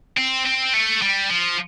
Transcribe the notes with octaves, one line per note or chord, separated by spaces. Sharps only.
C4
C4
A3
G3
F3